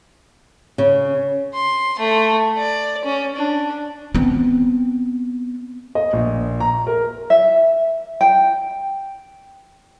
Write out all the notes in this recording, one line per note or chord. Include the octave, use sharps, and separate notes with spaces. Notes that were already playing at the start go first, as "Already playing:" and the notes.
C#3
C6
A3
D5
C#4
D4
B3 C4
D#5
A#1
A#5
A#4
E5
G5